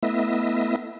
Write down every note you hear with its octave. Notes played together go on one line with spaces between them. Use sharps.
A3 B3 E4 D#5 E5